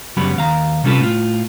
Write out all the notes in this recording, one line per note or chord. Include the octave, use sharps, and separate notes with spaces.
F#2 C#3 F#3 G3 B3 B5
D#2 F5 A#5
C3 G3 C#4 F4 A4 B4
A2 F4